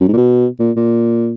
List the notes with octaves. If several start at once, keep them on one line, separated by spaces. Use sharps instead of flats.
F#2
G#2
A#2
B2
A#2
A#2